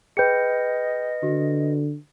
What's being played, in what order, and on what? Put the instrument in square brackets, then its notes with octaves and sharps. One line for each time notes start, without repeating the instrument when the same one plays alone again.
[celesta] G#4 G5 G6 [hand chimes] B4 C#7 [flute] D#5
[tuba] D3 [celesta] F#4